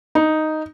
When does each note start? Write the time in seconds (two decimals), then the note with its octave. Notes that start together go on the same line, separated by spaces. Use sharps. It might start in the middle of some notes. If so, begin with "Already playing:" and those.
0.15 D#4